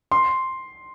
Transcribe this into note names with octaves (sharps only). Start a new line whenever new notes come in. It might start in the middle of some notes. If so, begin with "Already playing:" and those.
C6